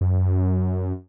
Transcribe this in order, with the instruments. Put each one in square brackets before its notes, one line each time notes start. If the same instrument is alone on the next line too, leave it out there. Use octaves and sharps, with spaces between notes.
[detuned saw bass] F#2